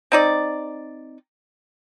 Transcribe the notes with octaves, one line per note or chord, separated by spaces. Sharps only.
C4 D#4 D5